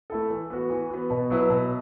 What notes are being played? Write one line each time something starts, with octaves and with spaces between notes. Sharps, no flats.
A3 E4 A4
E3
B3 F#4
E3
B3 F#4
B2
F#3 B3 E4 B4
B2